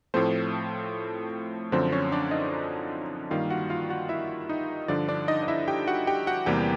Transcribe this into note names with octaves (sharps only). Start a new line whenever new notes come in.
A2 F3 A3 C4 C5
F#2 D3 F3 C4 C5
C#4 C#5
D4 D5
D#4 D#5
G2 D#3 G3 A#3 F4 F5
F#4 F#5
F4 F5
F#4 F#5
E4 E5
D#4 D#5
G2 D3 F3 D4 D5
D4 D5
D#4 D#5
D#5
E4 E5
G4 G5
F#4 F#5
G4 G5
F#4 F#5
E2 C3 E3 G3 A#3 G4 G5